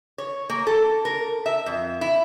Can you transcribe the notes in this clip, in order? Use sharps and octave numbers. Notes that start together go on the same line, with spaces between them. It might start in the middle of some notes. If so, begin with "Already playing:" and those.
C#5
A#3
A4
A#4
E5
F2
E4